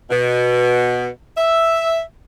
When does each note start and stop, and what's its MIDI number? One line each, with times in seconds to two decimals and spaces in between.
0.10 1.07 47
1.37 2.00 76